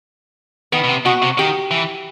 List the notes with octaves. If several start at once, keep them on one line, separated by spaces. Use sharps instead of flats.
D#3 B3
B2
C3
B2 F#4
C3
D#3 G4
E3